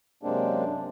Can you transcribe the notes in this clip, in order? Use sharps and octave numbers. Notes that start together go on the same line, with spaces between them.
F#2 C3 G#3 A#3 C4 D4